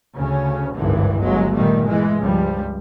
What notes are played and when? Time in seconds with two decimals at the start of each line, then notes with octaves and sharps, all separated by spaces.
0.17 D2 C#3 C#4
0.74 G#1 C#2 G2 D3 E3
1.20 G1 F#3 G#3
1.54 A#2 D#3 G3 A3
1.83 E3 G#3
2.18 C#2 G2 F3 G3